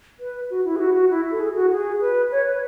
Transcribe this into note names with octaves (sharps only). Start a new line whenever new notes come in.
B4
F#4
E4
G#4
F#4
F#4
E4
A4
G#4
F#4
G#4
B4
C#5
B4